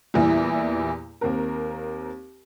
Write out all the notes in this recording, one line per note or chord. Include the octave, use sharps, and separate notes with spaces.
E2 A#2 E3 G3 E4
D#2 C4 A#4